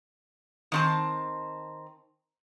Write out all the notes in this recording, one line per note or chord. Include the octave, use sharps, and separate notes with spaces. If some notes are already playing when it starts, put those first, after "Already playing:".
D#3 C4 A5